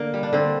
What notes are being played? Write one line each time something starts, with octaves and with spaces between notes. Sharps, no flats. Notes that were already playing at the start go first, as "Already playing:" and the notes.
Already playing: D3 A#3
G3
D4
D3 C4